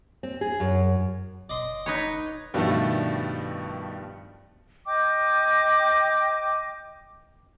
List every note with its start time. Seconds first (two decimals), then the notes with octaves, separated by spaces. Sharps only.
0.23 C4
0.41 G#4
0.60 F#2
1.49 F#1 D5 D#5 C6
1.86 D#4 B4 C#5
2.54 G2 B2 D#3 F3 G3 A3
4.87 D#5 G5 D6 G6